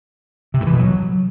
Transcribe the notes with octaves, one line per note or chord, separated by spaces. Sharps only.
C3
G2
E3
B2
F#3